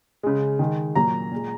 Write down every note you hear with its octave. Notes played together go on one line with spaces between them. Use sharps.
C#3 G#3
D#3 G#3
A#2 F#3 A#3 A#5
A#2 G#3